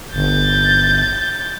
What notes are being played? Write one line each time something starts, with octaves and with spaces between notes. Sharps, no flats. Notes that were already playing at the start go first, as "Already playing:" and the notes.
G1 G6 A6